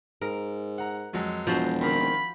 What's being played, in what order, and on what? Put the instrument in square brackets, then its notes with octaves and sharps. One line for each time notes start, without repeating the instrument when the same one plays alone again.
[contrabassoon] G#2 [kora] A#4
[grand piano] F#5 A#5
F2 F#3 G#3
[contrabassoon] E1 [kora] F3 F#4 C5
[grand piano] D#3 A#3 C4 [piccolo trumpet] B5